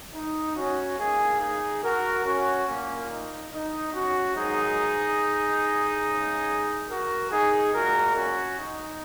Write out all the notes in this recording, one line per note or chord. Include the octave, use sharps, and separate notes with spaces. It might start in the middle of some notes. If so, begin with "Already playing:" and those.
D#4
C#4 F#4
C#3 A#3 D#4 G#4
D#4 G#4
F#4 A#4
C#4 F#4
A#2 A#3 C#4
D#4
D#4
C#4 F#4
G#2 D#3 F#3 D#4 G#4
C#3 G#3
F#4 A#4
D#4 G#4
A#2 G#3 F#4 A#4
C#4 F#4
D#4